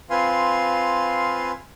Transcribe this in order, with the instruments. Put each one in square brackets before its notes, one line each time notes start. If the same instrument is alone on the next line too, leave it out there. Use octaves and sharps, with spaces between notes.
[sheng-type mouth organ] C4 F4 B4 F5 G#5 C6